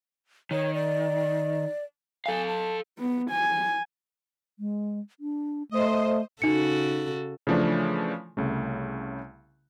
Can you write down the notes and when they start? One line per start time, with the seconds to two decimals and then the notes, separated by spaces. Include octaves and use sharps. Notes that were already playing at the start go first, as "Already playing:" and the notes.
0.51 D#3 C#5
0.75 D5
2.26 A4 F5 G#5
2.47 A5
2.99 B3
3.31 G#5
4.59 G#3
5.20 D4
5.71 A3 C5 D#5
6.42 C#3 D#4 F#4 A4 C#7
7.47 C#3 E3 F3 A3 D4
8.37 C2 C#3 A3